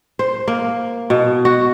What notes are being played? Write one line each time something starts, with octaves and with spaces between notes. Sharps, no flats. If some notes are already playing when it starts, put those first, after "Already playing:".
C5
A#3
B2
F#4